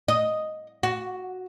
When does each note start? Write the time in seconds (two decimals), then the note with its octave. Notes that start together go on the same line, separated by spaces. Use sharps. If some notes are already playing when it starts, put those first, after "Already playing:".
0.08 D#5
0.83 F#4